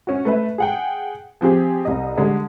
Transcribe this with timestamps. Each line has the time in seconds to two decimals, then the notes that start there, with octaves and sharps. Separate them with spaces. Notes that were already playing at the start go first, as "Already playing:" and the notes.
0.07 C#4 F#4
0.25 A3 B4 E5
0.58 G#4 F#5 G5
1.41 F3 C4 G4 G#4
1.85 C2 D#5
2.17 D3 G3 G#3